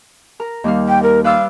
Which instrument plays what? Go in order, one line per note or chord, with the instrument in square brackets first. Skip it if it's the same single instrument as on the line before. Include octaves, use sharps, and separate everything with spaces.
[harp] A#4 A#5
D#2 G3 F5
[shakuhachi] G5
A#4
[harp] B4 D5 E6 [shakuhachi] F5